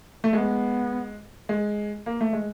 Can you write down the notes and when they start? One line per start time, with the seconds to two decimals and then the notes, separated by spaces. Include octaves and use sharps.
0.24 A3
0.33 G#3 B3
1.49 G#3
2.06 A#3
2.21 A3
2.33 G#3